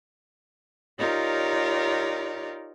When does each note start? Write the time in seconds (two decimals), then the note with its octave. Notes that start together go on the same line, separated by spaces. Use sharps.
0.98 D#4 F4 G4 A#4 C#5 D5